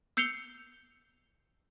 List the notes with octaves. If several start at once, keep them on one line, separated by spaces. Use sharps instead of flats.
E6 G6 C7 C#7 F7 G7